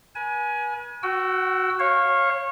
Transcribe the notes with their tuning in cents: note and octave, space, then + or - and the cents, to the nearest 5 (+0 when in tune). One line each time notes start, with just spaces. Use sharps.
B4 -40 G#5 +15
F#4 +0 G5 -45 E6 +5
C#5 -25 F5 +0